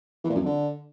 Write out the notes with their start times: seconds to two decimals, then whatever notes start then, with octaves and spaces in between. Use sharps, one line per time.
0.25 E3
0.30 A#2
0.35 F#2
0.40 F2
0.45 D3